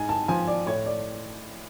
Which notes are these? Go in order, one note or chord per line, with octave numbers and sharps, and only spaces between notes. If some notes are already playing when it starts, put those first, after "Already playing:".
Already playing: G#2 G#5
A5
F3 G#5
D5
A2 C#5
D5